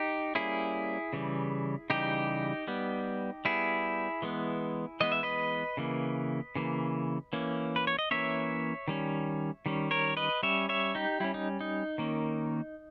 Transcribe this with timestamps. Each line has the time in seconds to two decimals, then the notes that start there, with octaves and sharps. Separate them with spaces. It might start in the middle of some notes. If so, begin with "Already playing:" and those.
Already playing: D#4 G4
0.35 G3 A#3 C#4 E4 G#4
1.13 C#3 E3 G3
1.90 C#3 E3 G3 D#4 G4
2.68 G3 B3
3.45 G3 B3 E4 G#4
4.22 E3 G#3 B3
5.00 E3 G#3 B3 D#5
5.12 E5
5.23 B4 D#5
5.77 C#3 E3 A#3
6.55 C#3 E3 A#3
7.33 E3 A#3 C#4
7.76 B4
7.87 C#5
7.99 D#5
8.11 E3 A#3 C#4 C#5 E5
8.88 D#3 G3 C#4
9.66 D#3 G3 C#4
9.91 A#4 C#5
10.17 B4 D#5
10.43 G3 C#4 C#5 E5
10.69 C#5 E5
10.95 D#4 G4
11.20 G3 C#4 E4
11.34 D#4
11.61 D#4
11.98 D#3 A#3 C#4